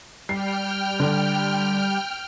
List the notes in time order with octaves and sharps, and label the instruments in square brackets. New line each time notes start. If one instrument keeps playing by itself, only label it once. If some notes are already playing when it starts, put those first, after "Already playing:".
[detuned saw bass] G3 [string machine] G5 F6 [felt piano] C7
[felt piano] D3